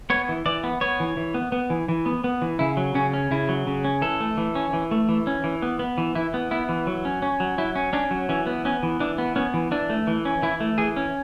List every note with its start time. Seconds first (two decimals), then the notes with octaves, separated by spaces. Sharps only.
0.10 B3 C#5
0.29 E3
0.46 E3 D5
0.64 B3
0.81 B3 C#5
1.00 E3
1.17 E3
1.34 B3
1.52 B3
1.70 E3
1.88 E3
2.06 B3
2.24 B3
2.42 E3
2.59 C#3 E4
2.77 F#3
2.95 C#3 C#4
3.14 C#4
3.31 C#3 E4
3.49 F#3
3.67 C#3
3.85 C#4
4.02 E3 A4
4.20 A3
4.37 E3
4.55 C#4
4.73 E3
4.91 A3
5.09 E3
5.27 C#4
5.44 E3
5.62 B3
5.79 B3
5.98 E3
6.15 E3 E4
6.34 B3
6.51 B3 E4
6.69 E3
6.87 F#3
7.05 C#4
7.22 C#4
7.40 F#3
7.58 F#3 E4
7.76 C#4
7.93 C#4 D4
8.11 F#3
8.29 E3 C#4
8.47 B3
8.65 B3 C#4
8.83 E3
9.00 E3 D4
9.18 B3
9.36 B3 C#4
9.54 E3
9.71 E3 D4
9.90 A3
10.07 E3
10.25 C#4
10.42 E3 E4
10.60 A3
10.78 E3 G#4
10.96 C#4